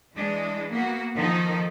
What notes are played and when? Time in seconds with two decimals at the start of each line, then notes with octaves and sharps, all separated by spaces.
0.14 E3 G#3 D4
0.71 A#3 B3 F#4
1.15 D#3 F3 D#4 A4